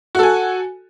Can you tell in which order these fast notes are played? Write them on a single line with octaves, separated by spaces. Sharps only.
F#4 A4 G#5